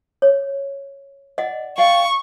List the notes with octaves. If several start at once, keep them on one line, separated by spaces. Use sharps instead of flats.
C#5
D5 D#5 F#5
D5 F5 G5 C#6